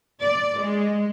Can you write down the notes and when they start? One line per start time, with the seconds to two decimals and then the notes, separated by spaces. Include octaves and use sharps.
0.22 D5
0.60 G#3